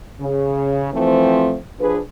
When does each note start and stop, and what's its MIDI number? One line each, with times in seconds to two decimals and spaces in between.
0.20 0.88 49
0.93 1.55 52
0.93 1.55 53
0.93 1.55 57
0.93 1.55 60
1.80 1.98 53
1.80 1.98 62
1.80 1.98 68
1.80 1.98 71